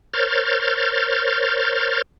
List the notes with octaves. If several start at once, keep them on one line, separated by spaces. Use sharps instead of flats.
A#4 C5 C#5 F6 G6 A6